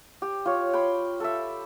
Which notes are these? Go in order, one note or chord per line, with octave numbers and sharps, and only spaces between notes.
G4
F4 C#5
G5 B5 C6
A4 E5